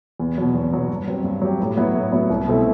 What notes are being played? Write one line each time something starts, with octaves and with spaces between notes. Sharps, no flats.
E2
B2 F#3
E2
B2 F#3
G2
F#3 C4 G4
G2
F#3 C4 G4
A2
F#3 B3 E4
A2
F#3 B3 E4
C2
B2 A3 C4 E4